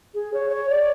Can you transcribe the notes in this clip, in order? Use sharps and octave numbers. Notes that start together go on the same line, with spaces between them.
G#4
C#5
C#5
D5